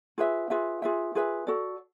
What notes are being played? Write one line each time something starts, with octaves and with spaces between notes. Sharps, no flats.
F4 G#4 B4 E5
F4 G#4 B4 E5
F4 G#4 B4 E5
F4 G#4 B4 E5
F#4 A4 D5